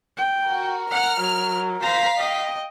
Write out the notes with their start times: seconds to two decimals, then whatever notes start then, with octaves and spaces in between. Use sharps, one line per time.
0.17 G5
0.48 F#4 A#4
0.91 F#5 F6
1.20 F#3
1.82 C5 F5 A#5 B6
2.17 D#5 G5